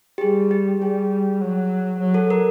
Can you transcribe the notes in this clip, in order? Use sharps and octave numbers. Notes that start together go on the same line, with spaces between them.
G4
G3 G#4
G4
G3 G#4
F#3
F#3
A4
A#4